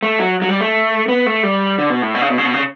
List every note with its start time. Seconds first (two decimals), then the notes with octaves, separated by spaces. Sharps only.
0.03 A3
0.19 F#3
0.42 F#3
0.49 G3
0.61 A3
1.08 B3
1.26 A3
1.43 G3
1.78 D3
1.90 B2
2.02 A2
2.14 B2
2.22 C#3
2.30 B2
2.38 C#3
2.45 B2
2.53 C#3